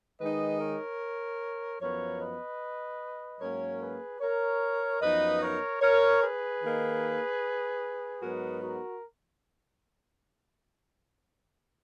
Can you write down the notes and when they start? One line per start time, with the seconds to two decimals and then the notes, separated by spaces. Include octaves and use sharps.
0.20 D#3 G#3 D#4 B4 D#5
0.60 A#4 C#5
1.80 F#2 F3 B3 A#4 C#5
2.20 B4 D#5
3.41 G#2 F#3 A#3 C#4 A#4 C#5
3.81 G#4 B4
4.20 A#4 C#5
5.01 F#2 F3 B3 D#4 B4 D#5
5.42 A#4 C#5
5.81 A#4 C#5
6.21 G#4 B4
6.61 D#3 A#3 D#4
8.22 G#2 F#3 B3 D#4 F#4 A#4
8.62 F#4 A#4